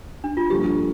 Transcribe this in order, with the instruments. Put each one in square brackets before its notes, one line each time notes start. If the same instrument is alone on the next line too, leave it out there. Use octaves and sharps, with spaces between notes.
[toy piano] D4
F4
[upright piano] G2 D3 F3 A#3 [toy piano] G4